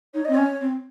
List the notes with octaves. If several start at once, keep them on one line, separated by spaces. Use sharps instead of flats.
D#4 C#5
C4 D#5
C#4 C#5
C4